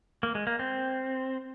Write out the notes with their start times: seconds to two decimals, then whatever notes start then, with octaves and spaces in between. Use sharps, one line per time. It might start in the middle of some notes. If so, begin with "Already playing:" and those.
0.23 A#3
0.35 G#3
0.47 A#3
0.59 C4